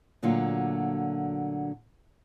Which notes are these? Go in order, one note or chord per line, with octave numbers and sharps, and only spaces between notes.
D2 A#2 D3 F#3 A#3 F4